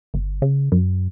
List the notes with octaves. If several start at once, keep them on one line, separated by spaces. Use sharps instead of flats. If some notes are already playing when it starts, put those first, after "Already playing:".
G1
C#3
F#2